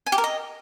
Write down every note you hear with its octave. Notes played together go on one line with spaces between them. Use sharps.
G#5
G4
A#4
D#5